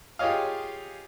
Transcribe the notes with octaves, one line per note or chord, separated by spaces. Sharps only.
F4 G4 G#4 C#5 D#5 F5